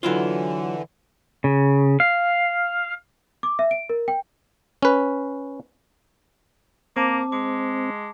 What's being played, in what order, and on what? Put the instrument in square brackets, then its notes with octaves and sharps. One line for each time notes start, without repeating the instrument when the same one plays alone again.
[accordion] D3 E3 [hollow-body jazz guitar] F#3 E4 F4
[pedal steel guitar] C#3
F5
[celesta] D6
E5
D7
A#4
G5
[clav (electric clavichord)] C#4 B4
[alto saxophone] A#3 [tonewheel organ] C4 [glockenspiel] A5 D6
[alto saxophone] G#3 [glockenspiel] D6